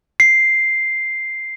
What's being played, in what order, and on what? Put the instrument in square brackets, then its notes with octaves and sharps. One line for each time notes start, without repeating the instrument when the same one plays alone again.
[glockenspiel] C7